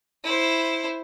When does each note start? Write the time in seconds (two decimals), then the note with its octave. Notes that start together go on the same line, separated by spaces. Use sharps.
0.24 E4 C5